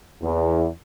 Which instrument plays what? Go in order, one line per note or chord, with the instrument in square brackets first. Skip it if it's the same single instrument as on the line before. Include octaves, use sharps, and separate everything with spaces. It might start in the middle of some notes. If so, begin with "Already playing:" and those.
[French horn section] E2